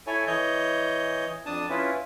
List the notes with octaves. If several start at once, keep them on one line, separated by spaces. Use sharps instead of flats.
E4 A4 C#5 G#5
E3 C#5 D#5 G6
F2 D4 A5 D#6
C#4 E4 F4 B4